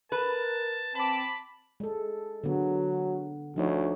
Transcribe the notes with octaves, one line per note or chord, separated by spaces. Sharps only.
A#4 B4 A5
C4 A5 B5 D6
G#3 A4
D3 F#3 B3
D2 F3 D#4 C#5